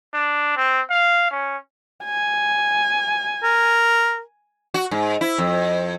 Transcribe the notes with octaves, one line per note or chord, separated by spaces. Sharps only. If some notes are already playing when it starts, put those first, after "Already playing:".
D4
C4
F5
C#4
G#5
A#4
F#4
G#2
E4
F2